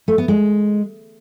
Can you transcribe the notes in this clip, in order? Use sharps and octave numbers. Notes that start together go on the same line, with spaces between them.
A3
B3
G#3